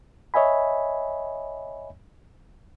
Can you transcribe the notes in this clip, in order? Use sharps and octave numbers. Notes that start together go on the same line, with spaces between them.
C#5 D#5 E5 G#5 B5